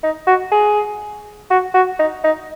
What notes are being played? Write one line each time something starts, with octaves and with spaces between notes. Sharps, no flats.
D#4
F#4
G#4
F#4
F#4
D#4
D#4